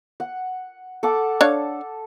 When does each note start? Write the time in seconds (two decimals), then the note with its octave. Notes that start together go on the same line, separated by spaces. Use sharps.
0.20 F#5
1.03 A4 F#5 D6
1.41 D4 C#5 F5